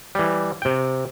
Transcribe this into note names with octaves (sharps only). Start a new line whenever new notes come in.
E3 G3
C3 G5